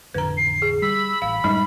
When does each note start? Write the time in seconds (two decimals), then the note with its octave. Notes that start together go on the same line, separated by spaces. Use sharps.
0.14 A1 F2 D3 B4 A#5
0.37 C7
0.62 G#4
0.82 G3 B5 E6
1.22 A1 F5
1.44 F#2 A2 G3 G#3 C#4 D#4